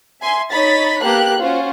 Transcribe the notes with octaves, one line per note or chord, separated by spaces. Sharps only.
E5 G#5 C6
D#4 C#5 D#5 B5 A6 B6
A#3 B3 G4 A4 A#4 F#6
C#4 F4 F#4 C5